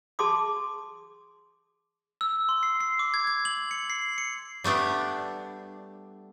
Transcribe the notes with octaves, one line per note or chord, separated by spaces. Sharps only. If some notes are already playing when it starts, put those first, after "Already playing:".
G#4 A5 C6 D6 D#6
E6
C6
C7
C7
D6
G#6
G#6
F#7
C#7
C7
C#7
G3 A3 B3 D4